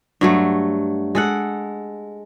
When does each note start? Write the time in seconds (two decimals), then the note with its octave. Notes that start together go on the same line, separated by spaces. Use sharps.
0.21 G2 F#3 A3
1.15 G#3 A4 F#5